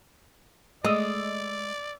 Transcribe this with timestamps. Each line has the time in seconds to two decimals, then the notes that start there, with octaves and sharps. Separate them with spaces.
0.85 G#3 A3 D5 D#5 E6